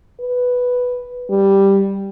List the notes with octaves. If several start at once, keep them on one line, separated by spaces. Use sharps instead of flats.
B4
G3